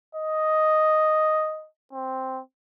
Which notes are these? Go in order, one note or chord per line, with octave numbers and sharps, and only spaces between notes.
D#5
C4